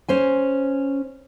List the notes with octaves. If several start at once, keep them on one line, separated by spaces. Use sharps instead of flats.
C#4 C5 G#5